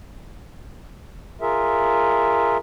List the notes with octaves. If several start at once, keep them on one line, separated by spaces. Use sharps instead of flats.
F4 G#4 A#4 E5